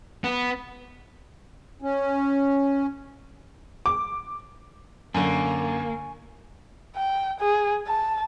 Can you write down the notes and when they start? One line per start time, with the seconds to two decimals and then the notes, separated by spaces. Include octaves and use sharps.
0.24 B3
1.82 C#4
3.86 D6
5.14 F#2 D3 A#3 G#5 C#6
6.96 G5
7.40 G#4
7.87 A5